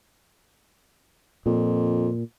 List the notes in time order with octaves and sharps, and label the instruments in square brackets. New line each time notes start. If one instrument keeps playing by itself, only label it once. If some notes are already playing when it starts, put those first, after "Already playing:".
[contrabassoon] F2 [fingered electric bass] A#2